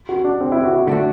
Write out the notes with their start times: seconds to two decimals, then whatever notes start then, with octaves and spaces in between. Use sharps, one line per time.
0.09 F#4
0.24 D4
0.40 C4
0.52 E4
0.64 F#4
0.75 E4
0.87 D3 A3 D4 F#4